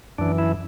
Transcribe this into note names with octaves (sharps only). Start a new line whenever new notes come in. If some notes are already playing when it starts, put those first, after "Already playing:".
F#2 E3 D4
E4